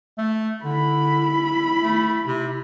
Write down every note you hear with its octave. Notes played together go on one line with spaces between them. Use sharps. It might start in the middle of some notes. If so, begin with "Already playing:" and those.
A3
D3 E4 B5
A3
C3